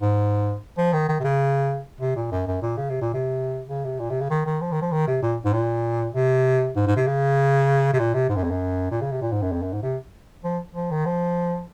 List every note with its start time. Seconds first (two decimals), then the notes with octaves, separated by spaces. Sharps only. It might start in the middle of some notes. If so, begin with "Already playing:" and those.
0.01 G#2
0.78 F3
0.93 D#3
1.09 D#3
1.20 C3
1.24 C#3
2.01 C3
2.16 A#2
2.31 F#2
2.47 F#2
2.62 A#2
2.77 C#3
2.90 C3
3.01 A#2
3.14 C3
3.69 C#3
3.85 C3
4.00 A#2
4.10 C3
4.21 C#3
4.31 D#3
4.46 D#3
4.61 F3
4.72 D#3
4.82 F3
4.92 D#3
5.07 C3
5.22 A#2
5.45 G#2
5.53 A#2
6.15 C3
6.76 G#2
6.87 G#2
6.96 C3
7.07 C#3
7.93 C3
7.99 A#2
8.14 C3
8.29 G#2
8.36 F#2
8.44 F2
8.51 F#2
8.91 A#2
9.01 C#3
9.12 C3
9.22 A#2
9.32 G#2
9.42 F#2
9.52 F2
9.62 F#2
9.73 G#2
9.83 C3
10.44 F3
10.75 F3
10.91 D#3
11.06 F3